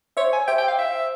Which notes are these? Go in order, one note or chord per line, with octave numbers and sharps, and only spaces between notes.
C5 C#5 E5
G#5
C5 E5 G5
G5
F5
E5